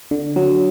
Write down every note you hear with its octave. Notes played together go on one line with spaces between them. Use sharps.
D3
F#3